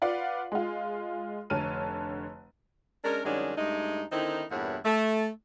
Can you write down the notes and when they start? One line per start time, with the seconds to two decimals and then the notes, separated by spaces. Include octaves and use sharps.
0.02 F4 B4 D5 F5 F#5
0.52 G#3 F4
1.50 F1 D3 C#5 A5 F6 D#7
3.04 G#3 C#4 D4 A#4
3.25 G2 D#3 F#3 G#3 C#4 D4
3.56 G2 G#3 A3 D#4
4.12 D3 D#3 C4 D#4 E4
4.51 E2 G2 A#2 E4 C#5 F#5
4.85 A3